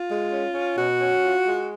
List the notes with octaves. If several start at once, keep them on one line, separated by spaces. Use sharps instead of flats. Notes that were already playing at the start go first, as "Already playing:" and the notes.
Already playing: F4
G#3
C#4
C#4
B2 F#4
C#4
F4
G#3